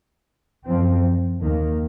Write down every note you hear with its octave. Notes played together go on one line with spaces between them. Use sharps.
F#2 F3 C4
D#2 D#3 A#3